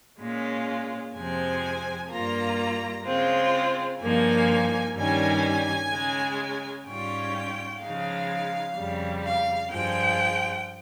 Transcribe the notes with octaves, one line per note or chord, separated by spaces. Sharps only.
A#2 G#3 C#4 F4
F2 C3 F3 G#3 C4 G#5
G2 G3 A#3 F4 A#5
C#3 G#3 C4 F4
G2 F3 A#3 D#4 G#5
G2 D#3 G3 C#4 G#5
C#3 G#3 C#4
G#2 G3 C#4 F4 G5
C#3 F3 G#3 D#4 F5
F2 C#3 G3
F5
G2 F3 G#3 G5